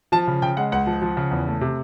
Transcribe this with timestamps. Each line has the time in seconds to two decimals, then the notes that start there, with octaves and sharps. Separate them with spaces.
0.12 F3 A5
0.27 C#3
0.42 C#3 G5
0.57 G#3 F#5
0.72 C#2 F#5
0.87 F3
1.02 F3
1.17 C#3
1.31 E2
1.47 A3
1.61 C3